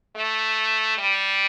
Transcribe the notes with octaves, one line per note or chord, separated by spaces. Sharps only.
A3
G3